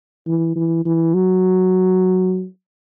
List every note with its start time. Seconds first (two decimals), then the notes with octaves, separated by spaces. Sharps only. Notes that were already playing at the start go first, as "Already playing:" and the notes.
0.27 E3
0.56 E3
0.85 E3
1.14 F#3